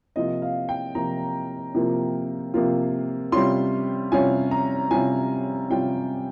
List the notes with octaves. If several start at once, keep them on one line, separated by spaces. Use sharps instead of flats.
C3 F3 A#3 F4 D#5
F5
G5
C3 F3 A#3 F4 A#5
C3 F3 A#3 F4
C3 F3 A#3 F4
C3 G3 C#4 F4 C6
C3 G3 C#4 F4 G#5
A#5
C3 G3 C#4 F4 G#5
C3 G3 C#4 F4 G5